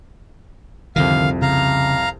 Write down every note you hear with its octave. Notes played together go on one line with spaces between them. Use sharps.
C2 F2 D3 D#3 F5
C#3 F5 A#5